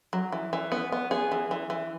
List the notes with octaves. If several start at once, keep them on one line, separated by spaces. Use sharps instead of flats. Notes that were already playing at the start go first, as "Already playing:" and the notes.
F#3
E3
E3
B3
B3
B3 G#4
E3
E3
E3